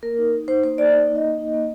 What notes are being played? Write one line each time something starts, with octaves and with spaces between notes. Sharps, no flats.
A#3 A#4
D#4
D#4
D#4 C5
A#3 C5
A#3 D5
C5
D#4 D5
D#4
D#5
A#3
D#4
A#3